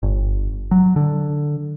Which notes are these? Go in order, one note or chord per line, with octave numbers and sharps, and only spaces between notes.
G1
F#3
D3